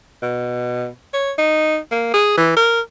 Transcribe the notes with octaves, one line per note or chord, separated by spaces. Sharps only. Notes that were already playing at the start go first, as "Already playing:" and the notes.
B2
C#5
D#4
A#3
G#4
E3
A#4